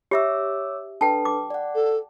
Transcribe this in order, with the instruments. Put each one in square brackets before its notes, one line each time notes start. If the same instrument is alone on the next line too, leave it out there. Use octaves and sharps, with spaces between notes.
[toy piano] G4 E5 [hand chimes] C#5 D6 E6
[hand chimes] D4 A4 B4 [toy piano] G5 A5
[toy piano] D6
[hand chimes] D5 F#5
[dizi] A4